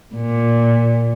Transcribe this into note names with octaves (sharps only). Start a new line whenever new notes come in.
A#2